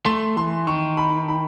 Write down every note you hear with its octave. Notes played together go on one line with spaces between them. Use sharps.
A3 C6
E3 C6
D#3 C#6
B5
B5